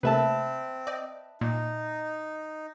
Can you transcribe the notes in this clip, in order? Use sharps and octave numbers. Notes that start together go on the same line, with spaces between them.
C3 A3 A#3 C4 B4 E5 A5
D5 D#5 G5
A#2 D#4